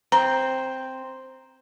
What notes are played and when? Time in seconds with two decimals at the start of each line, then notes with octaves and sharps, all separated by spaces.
0.12 C4 A#5